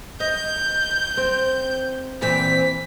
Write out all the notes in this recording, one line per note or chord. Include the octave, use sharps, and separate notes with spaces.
D#5 G6
C4
A#2 E3 C4 B6